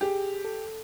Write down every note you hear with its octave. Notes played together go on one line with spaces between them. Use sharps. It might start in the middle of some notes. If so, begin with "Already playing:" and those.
G4 G#4
A4